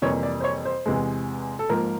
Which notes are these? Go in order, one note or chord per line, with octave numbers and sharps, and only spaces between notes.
F2 C3 E3 G3 A#3 C#5
D5
C5
C#5
C5
E2 C3 E3 G#3
A4
G#2 F3 A#3 A#4